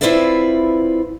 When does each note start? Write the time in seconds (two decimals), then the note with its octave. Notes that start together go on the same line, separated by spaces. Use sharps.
0.01 C4 E4 F4 B4 D5 E5